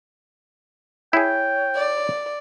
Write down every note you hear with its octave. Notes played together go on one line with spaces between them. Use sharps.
E4 G#4 C#5 G5
D5